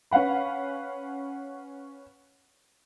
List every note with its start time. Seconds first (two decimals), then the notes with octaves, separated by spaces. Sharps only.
0.11 C#4 B4 F5 F#5 B5